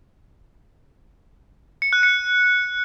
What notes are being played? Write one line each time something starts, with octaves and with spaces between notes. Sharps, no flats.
C#7
F#6
C#7